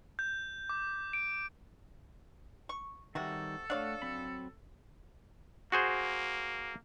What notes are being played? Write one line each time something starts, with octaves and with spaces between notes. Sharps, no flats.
G6
D6
D7
C#6
C3 D#3 G3 F#4 A4
A3 D4 C#5 F5 F#5
F#3 C4 B5
A#3 F#4 G#4 C5